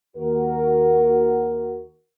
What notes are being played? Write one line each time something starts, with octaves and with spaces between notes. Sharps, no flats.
D#2 F#4 A#4